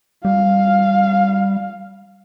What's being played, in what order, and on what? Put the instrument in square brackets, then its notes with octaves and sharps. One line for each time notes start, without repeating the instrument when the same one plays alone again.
[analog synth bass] G3 [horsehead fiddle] F5